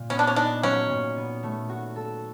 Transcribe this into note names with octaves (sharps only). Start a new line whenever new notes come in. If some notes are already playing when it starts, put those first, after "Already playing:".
Already playing: A#2
B3 C#4
D4
C#4
D4 D#4
F#3 C#4
A#2
B3
A3
F#4
A4